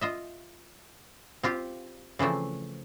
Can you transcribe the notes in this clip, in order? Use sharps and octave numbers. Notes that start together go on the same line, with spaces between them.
F4 D#5 E5
C4 F4 G4 F5
C#3 E3 F3 A3 C4